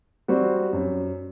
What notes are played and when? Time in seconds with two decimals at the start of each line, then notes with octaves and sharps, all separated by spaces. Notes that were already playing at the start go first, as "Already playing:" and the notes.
0.28 G3 C4 F#4
0.73 F#2